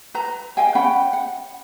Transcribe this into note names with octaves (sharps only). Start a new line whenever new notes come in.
B4 A#5
D#5 F5 G5 G#5
C#4 F#5 G5 B5
F#5